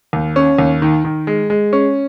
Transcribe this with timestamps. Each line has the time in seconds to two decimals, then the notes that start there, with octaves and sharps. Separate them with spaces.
0.13 D#2
0.36 C#4
0.59 D#2
0.82 D#3
1.04 D#3
1.27 G#3
1.50 G#3
1.73 C#4